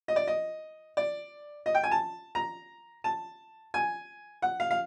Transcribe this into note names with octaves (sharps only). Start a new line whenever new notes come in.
D#5
D5
D#5
D5
D#5
G5
G#5
A5
A#5
A5
G#5
F#5
F5
F5